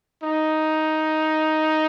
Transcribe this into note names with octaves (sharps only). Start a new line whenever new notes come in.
D#4